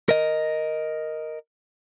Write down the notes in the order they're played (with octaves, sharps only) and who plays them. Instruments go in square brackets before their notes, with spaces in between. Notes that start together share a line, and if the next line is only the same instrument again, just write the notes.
[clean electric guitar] A#4 D#5